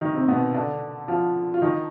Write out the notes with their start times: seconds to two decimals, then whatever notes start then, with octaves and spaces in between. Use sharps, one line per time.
0.01 D#3 D#4
0.14 C3 C4
0.28 B2 B3
0.55 D3 D4
1.08 F3 F4
1.54 F4
1.62 D#3 D#4